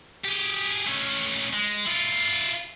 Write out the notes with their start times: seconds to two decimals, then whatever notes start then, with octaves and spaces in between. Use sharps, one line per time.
0.24 G4 G#4
0.87 A3 C#4
1.53 G#3
1.87 E4 F4